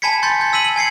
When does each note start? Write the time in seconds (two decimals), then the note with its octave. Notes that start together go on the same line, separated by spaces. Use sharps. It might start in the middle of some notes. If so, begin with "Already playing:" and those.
0.02 G#5 A5 B5 G#6 B6 C#7
0.23 C6 G6 A6
0.41 G6
0.53 E6 B6 D#7 F#7
0.64 F#7
0.76 G#5 G#6 C7 C#7